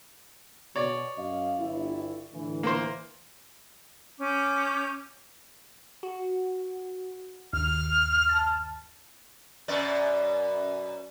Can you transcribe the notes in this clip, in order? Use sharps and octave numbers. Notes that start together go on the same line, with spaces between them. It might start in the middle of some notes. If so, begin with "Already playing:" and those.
B2 C#5 D5
F#2 D#5 F5
G1 E4
A2 D3 E3
A#3 A#4 C5
C#4 D6 G6
F#4
G1 D#2 F6
A5
F#2 B2 D5